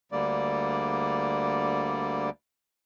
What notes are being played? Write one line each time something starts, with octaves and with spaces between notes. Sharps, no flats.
D2 D3 G3 A#3 D5